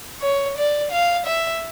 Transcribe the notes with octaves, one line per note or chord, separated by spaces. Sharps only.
C#5
D5
F5
E5